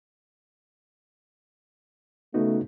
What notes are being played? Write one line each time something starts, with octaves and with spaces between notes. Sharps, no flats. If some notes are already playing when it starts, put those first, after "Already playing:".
C#3 A3 B3 D#4 F#4